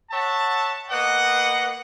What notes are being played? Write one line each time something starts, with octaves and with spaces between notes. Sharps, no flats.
C#5 E5 F#5 A5
A#3 B3 D#5 F#5